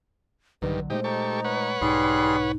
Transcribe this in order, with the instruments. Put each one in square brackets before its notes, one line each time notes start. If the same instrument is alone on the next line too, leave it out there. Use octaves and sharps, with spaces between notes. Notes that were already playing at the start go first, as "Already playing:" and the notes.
[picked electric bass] A#1 D3 F#3 [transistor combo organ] G2 D#3 [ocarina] B4
[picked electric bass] A#2 G#3 A3 [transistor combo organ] D#4 G4 [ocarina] C5
[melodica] D#4 [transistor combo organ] G4 A4 C#6
[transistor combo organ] B4 C#5 F#5
[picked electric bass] B1 G#2 B2 [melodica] G3 G#4 C6 [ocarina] D#4